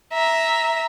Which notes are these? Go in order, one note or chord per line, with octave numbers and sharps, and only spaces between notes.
E5 A#5